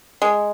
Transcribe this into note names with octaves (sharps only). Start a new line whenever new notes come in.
G#3